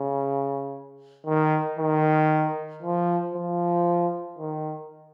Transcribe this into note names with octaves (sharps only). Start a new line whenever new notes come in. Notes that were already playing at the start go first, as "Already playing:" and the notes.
Already playing: C#3
D#3
D#3
F3
F3
D#3